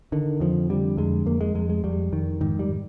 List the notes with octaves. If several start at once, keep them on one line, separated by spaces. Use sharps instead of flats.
D3 D#3
F2 F3
D3 G3
F2 G#3
F2 A#3
G#3
F2 G#3
G#3
F2 G3
F2 D#3
G#2 D#3
G3